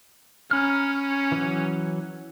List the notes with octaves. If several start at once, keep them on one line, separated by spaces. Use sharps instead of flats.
C#4 A#5 B5 F6
E3 F#3